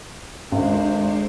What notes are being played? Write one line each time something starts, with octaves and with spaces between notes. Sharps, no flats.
G#1 D2 G#3 D4 C5